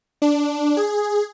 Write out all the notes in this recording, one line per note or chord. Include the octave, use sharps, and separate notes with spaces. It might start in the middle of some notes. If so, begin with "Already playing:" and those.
D4
G#4